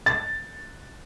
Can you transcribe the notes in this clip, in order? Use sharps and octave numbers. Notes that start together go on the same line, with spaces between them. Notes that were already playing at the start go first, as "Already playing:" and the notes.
A6